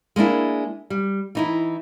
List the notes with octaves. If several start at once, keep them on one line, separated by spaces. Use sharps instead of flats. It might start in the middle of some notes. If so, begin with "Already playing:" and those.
G#3 A#3 D4 E4
G3
E3 D#4 E4